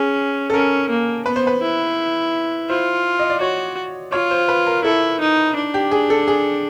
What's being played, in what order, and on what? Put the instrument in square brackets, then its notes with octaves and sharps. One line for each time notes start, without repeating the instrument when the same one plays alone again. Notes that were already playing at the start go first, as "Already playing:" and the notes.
Already playing: [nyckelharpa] C#4 [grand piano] G#4
[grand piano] A4
[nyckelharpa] C#4 [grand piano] A#4
[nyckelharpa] A#3
[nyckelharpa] B3 [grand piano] B4
[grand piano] C5
B4
[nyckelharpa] E4
[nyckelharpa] F4 [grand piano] C5
[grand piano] D#5
D5
[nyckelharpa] F#4 [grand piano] C#5
[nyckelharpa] F4 [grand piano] C#5
[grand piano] C5
B4
A#4
[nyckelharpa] E4 [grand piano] A4
[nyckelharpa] D#4
D4
[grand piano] G4
G#4
A4
G#4